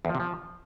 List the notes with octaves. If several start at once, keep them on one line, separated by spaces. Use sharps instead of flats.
E2
F3
C3
F3